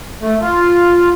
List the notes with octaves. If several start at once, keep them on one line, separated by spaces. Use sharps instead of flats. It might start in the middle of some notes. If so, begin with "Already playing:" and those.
A3
F4